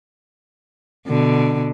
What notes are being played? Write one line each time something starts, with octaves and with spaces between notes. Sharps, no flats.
B2 D3